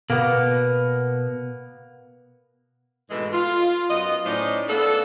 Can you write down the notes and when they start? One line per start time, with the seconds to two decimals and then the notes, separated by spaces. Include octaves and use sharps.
0.10 B2 A#3 B3
3.11 G#2 B2 E3 G#3 A3 A4
3.33 F4
3.89 F#2 B3 F4 D#5
4.26 A2 C#4 D#4 C5 D5
4.68 A#3 B3 D4 A4